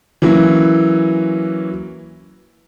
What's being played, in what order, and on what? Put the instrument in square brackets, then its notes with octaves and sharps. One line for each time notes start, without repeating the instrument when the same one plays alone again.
[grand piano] E3 F#3 A#3 C#4 E4